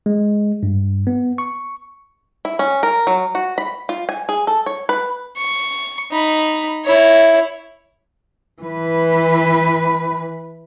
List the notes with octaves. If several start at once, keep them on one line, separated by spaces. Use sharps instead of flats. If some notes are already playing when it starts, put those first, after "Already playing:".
G#3
G2
B3
C#6
E4
C#4
A#4
F#3
F#4
B5
F4
G#5
G#4
A4
C#5
B4
C#6
D#4 B5
E4 C#5
E3 B4